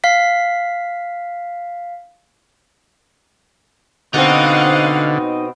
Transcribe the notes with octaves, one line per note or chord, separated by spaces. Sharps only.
F5 B6
B2 D3 C4 D#4 F5 F#5